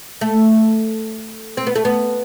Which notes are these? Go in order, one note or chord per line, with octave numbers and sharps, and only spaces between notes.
A3
C4
B3
A3
B3